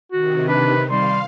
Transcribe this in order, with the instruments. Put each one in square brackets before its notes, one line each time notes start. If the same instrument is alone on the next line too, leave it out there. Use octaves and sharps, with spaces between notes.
[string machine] C3 D#3 [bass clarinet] F#4
[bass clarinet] D4 [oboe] B4
[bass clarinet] G3 [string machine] F5 [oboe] C6